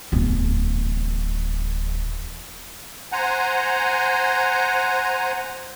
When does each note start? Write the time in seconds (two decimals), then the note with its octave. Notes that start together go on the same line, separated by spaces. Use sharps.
0.12 D1 E2
3.12 C5 F#5 G#5 A#5